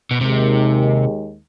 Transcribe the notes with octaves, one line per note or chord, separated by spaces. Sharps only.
B2
D#2 C3 D#3 G#3